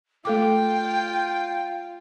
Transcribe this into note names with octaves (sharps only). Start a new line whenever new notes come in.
A3 F4 A4 G5 D6